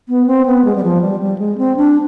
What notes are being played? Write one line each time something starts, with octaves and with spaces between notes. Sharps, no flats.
B3
C4
B3
G#3
G3
F3
G3
G3
G#3
C4
D4